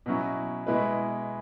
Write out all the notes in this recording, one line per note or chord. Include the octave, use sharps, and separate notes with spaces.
B2 F#3 C#4 E4
B2 G#3 E4 B4